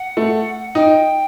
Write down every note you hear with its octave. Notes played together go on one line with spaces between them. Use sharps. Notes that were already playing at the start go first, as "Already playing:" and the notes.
Already playing: F#5
A3
D#4 G5